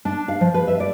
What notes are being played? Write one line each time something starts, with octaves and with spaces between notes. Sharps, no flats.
D4
F5
F3
B4
E5
D5